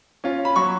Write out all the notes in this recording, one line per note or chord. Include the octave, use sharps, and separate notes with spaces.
C#4 F4
B5
F#3 C#6